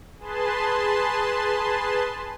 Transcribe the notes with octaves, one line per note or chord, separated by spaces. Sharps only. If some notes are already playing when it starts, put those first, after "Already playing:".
G#4 B4 A5 C6